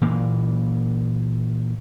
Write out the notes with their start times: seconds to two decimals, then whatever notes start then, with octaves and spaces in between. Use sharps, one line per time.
0.02 A#2 E3 A#3